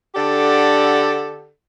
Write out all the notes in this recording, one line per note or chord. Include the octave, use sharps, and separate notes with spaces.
D3 D4 G4 A4 D5 F#5